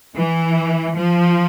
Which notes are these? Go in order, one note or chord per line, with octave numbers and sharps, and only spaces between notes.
E3
F3